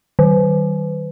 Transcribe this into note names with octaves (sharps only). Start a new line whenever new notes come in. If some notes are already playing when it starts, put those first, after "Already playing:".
D#3